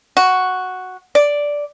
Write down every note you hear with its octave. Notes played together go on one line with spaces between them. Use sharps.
F#4
D5